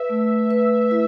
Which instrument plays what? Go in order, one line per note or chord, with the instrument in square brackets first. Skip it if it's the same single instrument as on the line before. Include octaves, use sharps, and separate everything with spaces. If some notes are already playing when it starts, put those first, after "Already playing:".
Already playing: [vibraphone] B4 [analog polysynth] E5
[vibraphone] A3
B4
E4